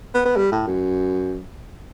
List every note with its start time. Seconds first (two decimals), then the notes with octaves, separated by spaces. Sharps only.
0.14 B3
0.26 B3
0.37 G3
0.52 A2
0.67 F#2